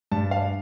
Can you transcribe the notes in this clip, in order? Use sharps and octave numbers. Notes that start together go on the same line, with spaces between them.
G2 A5
F5